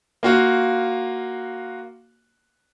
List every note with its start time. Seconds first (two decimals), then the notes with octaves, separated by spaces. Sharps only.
0.23 A#3 F4 F#4